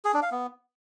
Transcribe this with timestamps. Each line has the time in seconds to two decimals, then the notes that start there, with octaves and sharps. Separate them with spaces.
0.05 G#4
0.14 D4
0.23 F5
0.31 B3